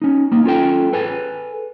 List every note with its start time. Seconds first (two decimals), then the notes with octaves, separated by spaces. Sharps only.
0.02 C#4 D#4
0.32 A#3 D#4
0.44 C#4 F4 A4 G5
0.92 G#4 A4 B4 G#5